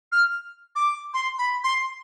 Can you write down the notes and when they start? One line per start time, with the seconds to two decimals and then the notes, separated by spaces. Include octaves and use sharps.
0.12 F6
0.76 D6
1.14 C6
1.38 B5
1.64 C6